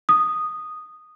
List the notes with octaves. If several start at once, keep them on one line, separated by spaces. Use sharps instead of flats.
D#6